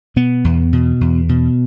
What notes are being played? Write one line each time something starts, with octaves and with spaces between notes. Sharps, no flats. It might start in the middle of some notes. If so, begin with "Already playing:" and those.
B2 B3
E2
B2
E2
B2